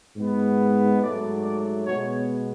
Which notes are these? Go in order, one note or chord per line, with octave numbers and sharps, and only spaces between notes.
G#2 G#3 B3
G#2 F#3 A3 D5
D5
B2 G#3 B3 C#5